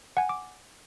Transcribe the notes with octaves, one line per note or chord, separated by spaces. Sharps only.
F#5 G#5
D6